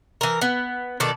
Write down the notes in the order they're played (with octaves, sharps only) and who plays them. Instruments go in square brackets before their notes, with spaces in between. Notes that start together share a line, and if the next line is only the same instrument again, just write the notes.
[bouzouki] E3 A#4
B3
B2 D#3 A4 D5